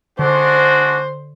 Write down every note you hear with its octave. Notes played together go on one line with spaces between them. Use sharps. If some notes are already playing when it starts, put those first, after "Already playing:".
D3 G#3 D4 F#4 C5